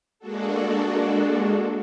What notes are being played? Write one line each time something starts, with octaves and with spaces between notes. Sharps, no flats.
G#3 A#3 D4 F#4 A4